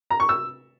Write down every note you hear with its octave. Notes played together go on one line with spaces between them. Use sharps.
A#5
C#6
E6